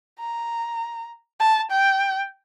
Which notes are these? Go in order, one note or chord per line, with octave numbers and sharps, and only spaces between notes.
A#5
A5
G5